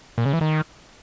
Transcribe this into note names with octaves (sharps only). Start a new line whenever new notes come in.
A#2
C#3
E3
D#3